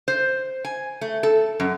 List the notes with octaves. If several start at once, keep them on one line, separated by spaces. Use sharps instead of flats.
C5
G#5
A3
A4
F#2